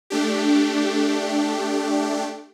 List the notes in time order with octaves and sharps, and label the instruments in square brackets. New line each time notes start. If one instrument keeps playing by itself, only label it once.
[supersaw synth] A3 D4 G4